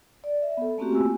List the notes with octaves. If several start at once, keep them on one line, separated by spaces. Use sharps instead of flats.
D5
E5
B3 A4
A3 A#3 C4 C#4 F#4 G4
F4 G#5 E6